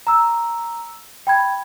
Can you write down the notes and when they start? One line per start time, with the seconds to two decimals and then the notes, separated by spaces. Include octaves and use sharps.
0.07 A#5 E6
1.27 G5 B5 G#6